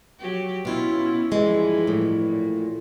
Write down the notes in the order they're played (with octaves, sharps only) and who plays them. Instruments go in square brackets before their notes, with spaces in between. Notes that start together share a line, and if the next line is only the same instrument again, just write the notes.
[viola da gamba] F#3 G4
[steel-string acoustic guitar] B2 F4 [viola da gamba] C#4 E4
[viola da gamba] G2 E3 F3 [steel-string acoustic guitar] G#3
[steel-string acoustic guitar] A2
[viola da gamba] A#2